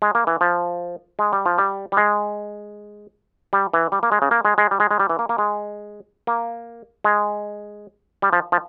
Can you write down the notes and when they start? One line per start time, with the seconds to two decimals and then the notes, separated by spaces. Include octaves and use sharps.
0.02 G#3
0.15 A#3
0.27 E3
0.41 F3
1.19 G#3
1.33 G3
1.46 F3
1.58 G3
1.92 G3
1.97 G#3
3.53 G3
3.74 E3
3.92 G3
4.03 A#3
4.12 G#3
4.22 C#3
4.31 A#3
4.45 G#3
4.58 G#3
4.71 G3
4.80 G#3
4.91 G#3
5.00 G3
5.09 E3
5.19 A#3
5.29 A#3
5.38 G#3
6.27 A#3
7.04 G#3
8.22 G3
8.33 F3
8.52 F3